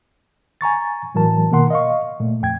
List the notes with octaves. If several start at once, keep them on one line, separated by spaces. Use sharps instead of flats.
G#5 A#5 C#6 A6
A2 E3 F#3 A#4 A5
B2 D#3 A#3 A#4 F#5 C6
D#5 F5 C#6
A#2 A3
F2 G5 G#6